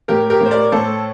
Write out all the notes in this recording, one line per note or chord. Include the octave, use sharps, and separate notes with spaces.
A2 G4 A#4
G4 A#4
A2
C5
A#4 D5
A2 A4 C5